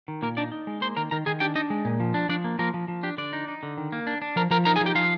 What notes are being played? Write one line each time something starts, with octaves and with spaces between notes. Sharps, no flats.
D#3
A#2 A#3 A#4
D4 D#4 D5
D#4
G#3
A#3 C5 C6
D#3 A#4 A#5
D#3 A#4 A#5
D#3 G#4 G#5
D4 G4 G5
D4 D#4 D#5
G#3
A#2
F3
D4
F3 D4 D5
A#3
F3 A#3 A#4
F3
F3
D4 G4
D3 D4 D5
D#4
D#4
D3
D#3
A#3
D4
D4
F3 A#4 A#5
F3 A#4 A#5
D#4 A#4 A#5
G#4 G#5
F3
G4 G5
F3 F4 F5